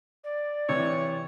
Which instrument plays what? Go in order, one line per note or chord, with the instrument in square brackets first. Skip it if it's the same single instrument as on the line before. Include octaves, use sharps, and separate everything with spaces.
[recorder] D5
[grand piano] C3 E3 [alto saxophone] C#5